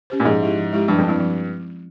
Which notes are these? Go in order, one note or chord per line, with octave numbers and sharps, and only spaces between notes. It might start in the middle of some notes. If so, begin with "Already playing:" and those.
C#4 G4 C5
A#2
G#2 F3
G#3 E4 G4
F3
G#3 E4 G4
G2 F3
F2
G2 C4 E4
F3